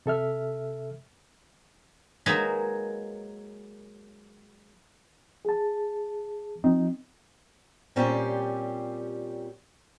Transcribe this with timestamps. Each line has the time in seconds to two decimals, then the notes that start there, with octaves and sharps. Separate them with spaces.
0.06 C3 A4 E5 F6
2.26 F#3 G#3 A#3 D#4 B4 G#5
5.45 G#4 A5
6.64 F3 C4 D#4
7.96 A#2 G3 C4 C#4 G4